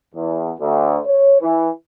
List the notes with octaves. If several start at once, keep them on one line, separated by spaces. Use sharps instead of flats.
E2
D2
C#5
E3